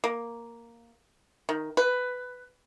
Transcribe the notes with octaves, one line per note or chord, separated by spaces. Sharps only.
A#3
D#3
B4